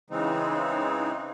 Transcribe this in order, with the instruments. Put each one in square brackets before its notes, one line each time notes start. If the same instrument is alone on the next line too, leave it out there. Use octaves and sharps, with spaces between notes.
[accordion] C#3 E3 G#3 C4 D#4